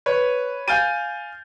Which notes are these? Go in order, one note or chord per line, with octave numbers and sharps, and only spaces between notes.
B4 C#5
F5 G#5 F6 G6 A6 D#7